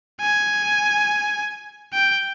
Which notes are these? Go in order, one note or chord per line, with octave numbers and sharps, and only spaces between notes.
G#5
G5